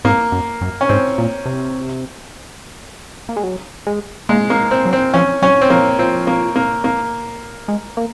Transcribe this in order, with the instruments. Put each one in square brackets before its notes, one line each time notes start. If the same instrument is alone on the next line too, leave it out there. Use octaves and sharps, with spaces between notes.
[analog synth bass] G#2 [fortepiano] A#3
[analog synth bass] F#2
F#2
[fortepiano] C#4
[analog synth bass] G#2 [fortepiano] C4
[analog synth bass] A#2
C3
A#3
G#3
F#3
G#3
[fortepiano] G#3 [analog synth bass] A#3
[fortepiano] A#3
C4
[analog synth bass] F#3
[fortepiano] C4
[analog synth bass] F3 [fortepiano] C#4
[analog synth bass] F#3 [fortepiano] C#4
[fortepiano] C4
[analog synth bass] F3 [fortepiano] A#3
[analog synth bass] F3 [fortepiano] C4
[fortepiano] A#3
A#3
A#3
[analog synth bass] G#3
A#3